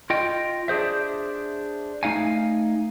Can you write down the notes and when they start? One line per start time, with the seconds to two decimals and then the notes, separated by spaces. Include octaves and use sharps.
0.10 F4 D#5 G5
0.68 D4 G#4 C5 E5
2.03 A3 D#4 F5 G#5